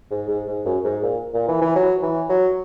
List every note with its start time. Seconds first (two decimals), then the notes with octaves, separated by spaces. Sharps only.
0.11 G#2
0.28 G#2
0.47 G#2
0.65 F#2
0.84 G#2
1.02 A#2
1.34 A#2
1.48 E3
1.61 E3
1.75 F#3
2.02 E3
2.29 F#3